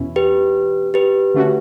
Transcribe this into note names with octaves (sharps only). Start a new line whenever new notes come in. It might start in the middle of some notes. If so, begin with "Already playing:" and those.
Already playing: E2 B2 C#4 E4
G4 B4
G4 B4
D3 A3 C#4 F#4